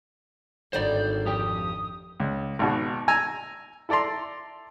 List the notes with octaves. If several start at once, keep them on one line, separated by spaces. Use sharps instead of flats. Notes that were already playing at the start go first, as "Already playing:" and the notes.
G#1 D3 G3 D#4 C5 D5 G6
F2 G4 G5 D#6
C#2
G#1 B2 F#4
G#5 A#5 E6
E4 A4 D5 A#5 C6